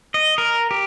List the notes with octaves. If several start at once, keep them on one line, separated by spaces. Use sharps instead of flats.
D#5
A#4
G4